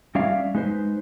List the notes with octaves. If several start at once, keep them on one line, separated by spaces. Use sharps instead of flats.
G3 C#4 D5 E5 F5
G#3 D#4 B4 C5